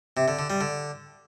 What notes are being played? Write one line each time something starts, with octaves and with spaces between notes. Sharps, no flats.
C3
D3
D3
G3
D3